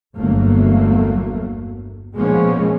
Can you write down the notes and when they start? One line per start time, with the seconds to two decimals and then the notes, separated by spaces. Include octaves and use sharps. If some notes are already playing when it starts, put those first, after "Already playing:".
0.15 G1 E2 F#3 A3 A#3
2.15 A#2 F3 G#3 A#3 B3 C#4